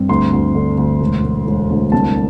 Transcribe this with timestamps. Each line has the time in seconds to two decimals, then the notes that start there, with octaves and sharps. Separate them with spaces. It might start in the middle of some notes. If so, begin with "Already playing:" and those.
Already playing: G2 C4
0.09 D2 C6
0.33 D2
0.55 D3
0.78 D2
1.01 E1
1.24 E1
1.47 E1
1.70 D2
1.92 C2 A5